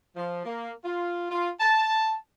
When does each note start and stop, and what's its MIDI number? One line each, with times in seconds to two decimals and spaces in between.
0.17 0.43 53
0.46 0.71 58
0.85 1.30 65
1.31 1.50 65
1.60 2.14 81